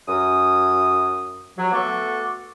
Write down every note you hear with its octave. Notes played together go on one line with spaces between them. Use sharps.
F#2 D#6
F#3
A3 B3 F#4 A4 C#6 D6